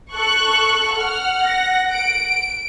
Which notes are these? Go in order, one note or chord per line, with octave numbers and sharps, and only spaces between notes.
A4 C#6 F#6
F#5 F6
A#6
D7